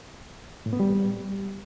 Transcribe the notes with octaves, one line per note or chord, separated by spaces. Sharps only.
A2
B3
G3